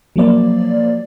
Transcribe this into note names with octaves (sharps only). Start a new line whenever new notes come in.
F3 F#3 A#3 D5